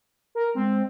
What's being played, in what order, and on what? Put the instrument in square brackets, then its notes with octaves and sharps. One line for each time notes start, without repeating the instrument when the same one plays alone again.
[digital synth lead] A#4
[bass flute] G#3 [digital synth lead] C4